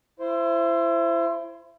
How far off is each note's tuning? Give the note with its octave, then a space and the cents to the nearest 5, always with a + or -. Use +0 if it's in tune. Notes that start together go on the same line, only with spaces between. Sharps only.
E4 +30 C5 +0